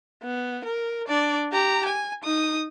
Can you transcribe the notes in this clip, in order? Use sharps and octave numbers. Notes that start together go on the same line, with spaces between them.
B3
A#4
D4 D5
G4 A#5
G#5
D#4 D#6